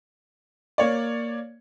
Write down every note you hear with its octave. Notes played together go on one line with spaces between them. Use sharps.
A#3 C#5 D5